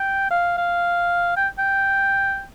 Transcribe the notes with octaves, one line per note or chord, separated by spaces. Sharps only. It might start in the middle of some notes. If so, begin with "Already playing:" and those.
Already playing: G5
F5
F5
G5
G5